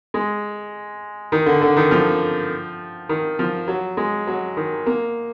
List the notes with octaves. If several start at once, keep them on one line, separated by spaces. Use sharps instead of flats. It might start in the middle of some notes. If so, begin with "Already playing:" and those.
G#3
D#3
D3
D3
D#3
F3
D#3
F3
F#3
G#3
F#3
D#3
A#3